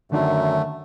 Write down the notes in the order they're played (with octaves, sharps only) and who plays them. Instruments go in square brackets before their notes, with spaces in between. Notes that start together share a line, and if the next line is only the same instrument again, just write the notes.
[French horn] F#2 [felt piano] D3 D#3 D4 [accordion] A3